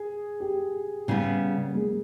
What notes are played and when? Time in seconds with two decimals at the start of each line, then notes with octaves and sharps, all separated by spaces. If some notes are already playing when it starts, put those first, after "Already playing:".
Already playing: G#4
0.40 G4
1.08 C#3 G3 B3
1.68 A#3
1.75 G#3